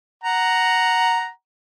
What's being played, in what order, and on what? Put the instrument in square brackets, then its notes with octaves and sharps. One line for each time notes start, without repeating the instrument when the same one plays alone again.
[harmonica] F#5 A#5